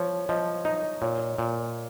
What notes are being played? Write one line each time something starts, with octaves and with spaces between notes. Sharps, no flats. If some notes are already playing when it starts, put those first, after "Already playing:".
Already playing: F3 C#5
F3 D#5
D#4 D#5
A#2 C#5
A#2